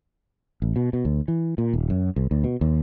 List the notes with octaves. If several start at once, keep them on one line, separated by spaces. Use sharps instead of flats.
A1
B2
B2
D2
E3
A#2
D#1
F#2
C2
D2
B2
D#2